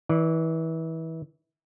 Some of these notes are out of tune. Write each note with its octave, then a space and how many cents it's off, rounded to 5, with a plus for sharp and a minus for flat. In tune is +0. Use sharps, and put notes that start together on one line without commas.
E3 -30 D5 +0